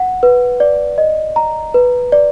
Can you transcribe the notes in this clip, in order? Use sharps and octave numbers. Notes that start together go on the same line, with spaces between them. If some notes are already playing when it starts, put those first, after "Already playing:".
Already playing: F#5
B4
D5
D#5
A#5
B4
D5